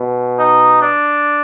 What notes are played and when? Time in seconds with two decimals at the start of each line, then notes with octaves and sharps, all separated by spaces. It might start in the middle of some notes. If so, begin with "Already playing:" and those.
Already playing: B2
0.38 D#4
0.81 D4